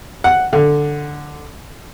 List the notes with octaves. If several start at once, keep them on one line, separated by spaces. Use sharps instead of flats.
F#5
D3